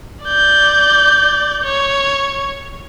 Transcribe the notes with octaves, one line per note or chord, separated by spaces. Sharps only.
D5 G6
C#5